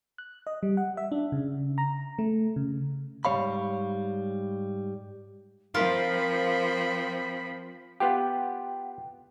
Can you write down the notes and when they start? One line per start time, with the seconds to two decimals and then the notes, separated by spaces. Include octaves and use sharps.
0.18 F#6
0.47 D#5
0.63 G3
0.77 F#5
0.97 E5
1.12 D4
1.32 C#3
1.78 A#5
2.19 A3
2.56 C#3
3.25 G#2 G3 G#3 C#5 F5 B5
5.74 F3 C4 F4 A#4 B5
8.00 B3 F4 G4 F#5 G5